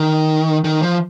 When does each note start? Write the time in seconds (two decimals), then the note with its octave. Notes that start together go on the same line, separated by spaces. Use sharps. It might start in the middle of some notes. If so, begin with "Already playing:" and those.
Already playing: D#3
0.64 D#3
0.82 F3